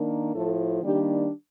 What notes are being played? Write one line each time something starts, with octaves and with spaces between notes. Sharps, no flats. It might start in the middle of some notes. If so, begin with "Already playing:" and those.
Already playing: D#3 A#3 D4
A2 F3 A3 A4
D#3 G3 A#3 D4 G4